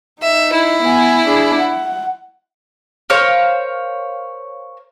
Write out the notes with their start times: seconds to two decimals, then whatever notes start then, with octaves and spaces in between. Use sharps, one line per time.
0.22 D#4 E5
0.52 E4
0.82 B3 G#5
1.24 D4 G#4
1.57 F#5
3.10 A#4 C5 C#5 F5